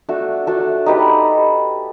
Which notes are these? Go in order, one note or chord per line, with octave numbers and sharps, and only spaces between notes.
A3 D4 F#4 A4
A3 D4 F#4 A4
D#4 G4 B4 D#5